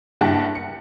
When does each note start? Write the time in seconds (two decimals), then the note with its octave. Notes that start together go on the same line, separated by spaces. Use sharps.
0.21 F#1 G2 E4 G4 F#5 A5
0.55 C#7